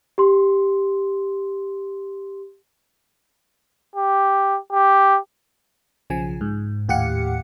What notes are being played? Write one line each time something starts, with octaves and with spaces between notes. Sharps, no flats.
G4 C6
G4
G4
B1 C#3 F3 G#5
G#2
D#2 A2 G4 F5 F#5 C#7